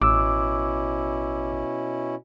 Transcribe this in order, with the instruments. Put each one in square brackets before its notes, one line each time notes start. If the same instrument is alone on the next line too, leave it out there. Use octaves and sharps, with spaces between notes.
[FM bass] A1 [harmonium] B2 C#4 E4 [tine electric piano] D6 E6